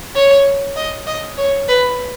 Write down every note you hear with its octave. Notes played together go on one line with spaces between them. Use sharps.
C#5
D#5
D#5
C#5
B4